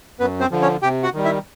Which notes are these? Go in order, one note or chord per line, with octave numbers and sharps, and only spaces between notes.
F#2 B3 B4
C4 C5
D3 F3
C#4 C#5
C3 G4 G5
F#4 F#5
D#3 G3
E4 E5